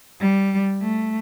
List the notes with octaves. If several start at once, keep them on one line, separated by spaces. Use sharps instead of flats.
G3
A3